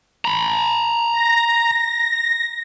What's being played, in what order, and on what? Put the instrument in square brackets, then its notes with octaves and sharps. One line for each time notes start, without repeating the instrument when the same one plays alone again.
[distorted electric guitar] A#5 B5
[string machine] A#6